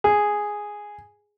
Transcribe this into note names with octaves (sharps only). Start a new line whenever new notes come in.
G#4